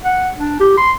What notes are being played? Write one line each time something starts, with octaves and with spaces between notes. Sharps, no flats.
F#5
D4
G4
C6